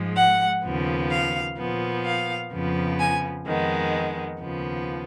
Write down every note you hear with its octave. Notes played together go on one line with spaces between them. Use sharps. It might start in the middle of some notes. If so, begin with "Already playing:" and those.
Already playing: G#2 F3 G#3
F#5
D#2 C#3 F3 B3
F5
A#2 F3 B3
F5
F2 C#3 F3 B3
G#5
F2 D#3 G#3 B3
D#2 C#3 F3 B3